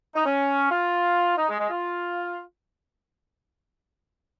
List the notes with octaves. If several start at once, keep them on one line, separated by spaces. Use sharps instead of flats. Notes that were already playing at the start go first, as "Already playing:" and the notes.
D#4
C#4
F4
D#4
G#3
G#3
F4